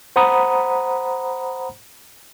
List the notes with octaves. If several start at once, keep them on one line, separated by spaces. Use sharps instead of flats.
C5 F#5 A#5 B5 D#6